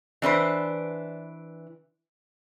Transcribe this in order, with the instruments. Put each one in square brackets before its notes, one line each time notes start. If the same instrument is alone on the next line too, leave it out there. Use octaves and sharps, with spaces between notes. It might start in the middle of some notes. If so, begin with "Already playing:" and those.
[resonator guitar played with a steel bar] E3 D4 B4 C5